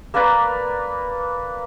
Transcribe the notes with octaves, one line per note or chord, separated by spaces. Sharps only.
A#3 A#4 B4 D5